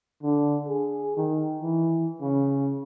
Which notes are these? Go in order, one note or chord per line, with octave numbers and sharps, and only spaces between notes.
D3
G#4
D#3
E3
C#3